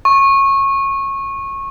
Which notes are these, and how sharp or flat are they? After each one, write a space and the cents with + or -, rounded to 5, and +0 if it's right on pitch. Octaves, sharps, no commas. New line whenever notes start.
C#6 -20